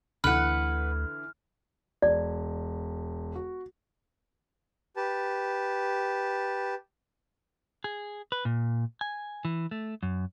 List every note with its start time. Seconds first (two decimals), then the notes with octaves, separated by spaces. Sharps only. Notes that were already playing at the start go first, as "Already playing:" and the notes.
0.24 D2 D3 E3 B4 F#5 F6
2.02 E1 D5
3.36 F#4
4.96 G4 B4 A5
7.84 G#4
8.32 B4
8.45 A#2
9.01 G#5
9.45 E3
9.71 A3
10.03 F#2